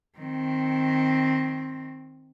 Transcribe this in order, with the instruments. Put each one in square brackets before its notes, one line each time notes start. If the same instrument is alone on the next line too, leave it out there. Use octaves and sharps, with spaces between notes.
[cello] D#3 C4